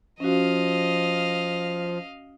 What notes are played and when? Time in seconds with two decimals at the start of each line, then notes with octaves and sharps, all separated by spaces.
0.20 F3 C#4 F#4 D#5 F5